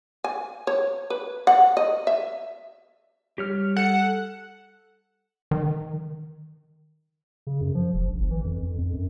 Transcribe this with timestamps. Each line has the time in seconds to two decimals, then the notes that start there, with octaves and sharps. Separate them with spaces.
0.24 G#5
0.67 C#5
1.10 B4
1.47 F#5
1.77 D#5
2.07 E5
3.38 G3 G4 C#5 F6
3.77 A4 F#5
5.51 D#3
7.47 C#3
7.61 F#2
7.75 F3
7.93 E1
8.08 A#1
8.19 G1
8.31 E3
8.45 F2
8.63 F2
8.78 F2
8.94 F#2